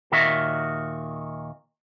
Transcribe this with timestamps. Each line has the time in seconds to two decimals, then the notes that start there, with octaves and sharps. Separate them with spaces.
0.12 D#2 A#2 D#3 F#4 E5